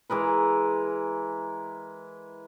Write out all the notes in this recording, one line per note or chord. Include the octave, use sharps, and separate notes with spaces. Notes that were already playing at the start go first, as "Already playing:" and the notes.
E3 G#3 A#4 B4